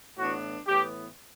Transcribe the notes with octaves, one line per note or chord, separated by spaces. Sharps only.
A2 E3 B3 D4 F#4
A2 E3 B3 G4